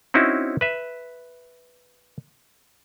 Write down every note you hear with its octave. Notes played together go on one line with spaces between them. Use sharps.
C4 C#4 D#4 E4 F#4
B4 E5